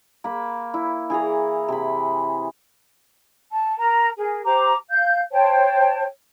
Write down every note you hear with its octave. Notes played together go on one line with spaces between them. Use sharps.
A#3 B5
E4
E3 G#4 G#5 A#5
C3 B5
A5
A#4 A#5
G#4 A#4
G4 C5 A#5 D6
F5 G6
C5 C#5 G5 A5